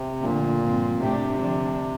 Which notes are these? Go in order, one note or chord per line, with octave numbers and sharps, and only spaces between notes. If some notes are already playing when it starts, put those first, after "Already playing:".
Already playing: C3
A#2 D3 F3 A3
G2 F3 C4
A2 C3 A3 D4 G4
D3 F3 A3 D4